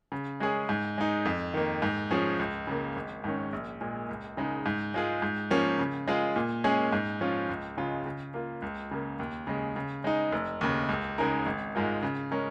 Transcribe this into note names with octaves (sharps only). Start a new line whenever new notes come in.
C#3
G#3 C#4 G#4
G#2
G#3 D#4
F2
D#3 A#3
G#2
F3 C#4 G#4
C#2
C#3 A#3
G#1
G#2 D#3 C#4
A#1
A#2 G#3
C#2
C#3 G#3 D#4
G#2
G#3 F4 G#4
G#2
F3 A#3 C#4
C#3
G#3 F4 G#4
A#2
G#3 C#4 G#4
G#2
F3 C#4 F4
C#2
C#3 G#3 F4
C#3
A#3 F4
C#2
C#3 A#3
D#2
C#3 G#3
C#3
G#3 D#4
F1
D#2 C#3
C#2
C#3 G#3 D#4 A#4
G#1
G#2 G#3 F4 A#4
C#3
G#3 C#4 A#4